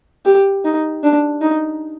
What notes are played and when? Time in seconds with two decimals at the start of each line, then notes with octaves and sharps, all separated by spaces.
0.25 G4
0.65 D#4
1.03 D4
1.41 D#4